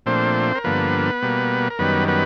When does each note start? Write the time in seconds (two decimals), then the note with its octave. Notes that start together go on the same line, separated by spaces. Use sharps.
0.06 A#2 F3 A3 C4 D4 C5
0.55 A#4
0.64 G2 D3 F3 A#3 B3 B4
1.22 B2 G3 A#3
1.70 A#4
1.79 F#2 D#3 G3 B3 B4
2.08 B3 B4